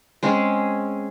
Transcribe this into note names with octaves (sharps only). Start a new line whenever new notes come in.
G#3 C4 C#4 G#4